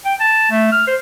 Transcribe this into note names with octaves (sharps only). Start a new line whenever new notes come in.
G5
A5
A3
F6
C5